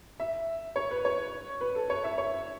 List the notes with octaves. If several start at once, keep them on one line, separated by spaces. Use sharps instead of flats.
E5
C#5
B4
C#5
B4
A4
C#5
E5
C#5